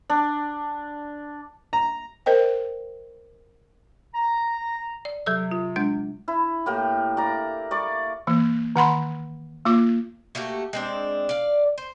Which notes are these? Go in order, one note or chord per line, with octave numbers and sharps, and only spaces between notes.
D4
A#5
A#4 C5 D#5 G5
A#5
D5
C3 F#3 A4 E6
F4
G#3 D4 G6
E4
A2 A#3 G4
D5 A#5
D5 C#6 D6
E3 A#3
D#3 F#5 B5 C6
A#3 F4 D6
A3 A#3 F#4 G4
G#3 C4 D4
D5 F5
C5